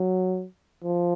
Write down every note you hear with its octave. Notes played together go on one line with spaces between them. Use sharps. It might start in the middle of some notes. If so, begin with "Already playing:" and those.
Already playing: F#3
F3